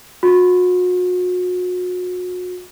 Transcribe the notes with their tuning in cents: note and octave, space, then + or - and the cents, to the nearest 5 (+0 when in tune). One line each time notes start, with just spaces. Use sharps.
F#4 -40